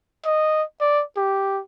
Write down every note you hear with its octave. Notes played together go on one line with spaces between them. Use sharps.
D#5
D5
G4